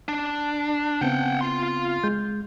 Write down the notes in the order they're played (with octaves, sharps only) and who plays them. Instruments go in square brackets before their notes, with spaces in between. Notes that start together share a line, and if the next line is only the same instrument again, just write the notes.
[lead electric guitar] D4
[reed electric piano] C#3 B3 C4 [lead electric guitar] F#5 G5
[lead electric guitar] F4 C6
[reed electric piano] G#3 G6